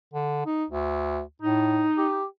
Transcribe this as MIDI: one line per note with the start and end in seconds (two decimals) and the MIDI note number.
0.14 0.44 50
0.46 0.65 63
0.70 1.21 38
1.42 1.87 45
1.42 2.19 63
1.98 2.25 67